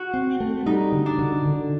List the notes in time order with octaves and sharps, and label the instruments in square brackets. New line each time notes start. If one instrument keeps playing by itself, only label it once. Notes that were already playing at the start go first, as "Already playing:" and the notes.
Already playing: [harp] F#4
[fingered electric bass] C4
A3
[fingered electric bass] G3 [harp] D#4
[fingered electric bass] D3
[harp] D4
[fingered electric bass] D3
D3